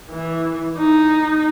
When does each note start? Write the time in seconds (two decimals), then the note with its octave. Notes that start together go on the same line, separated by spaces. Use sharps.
0.10 E3
0.78 D#4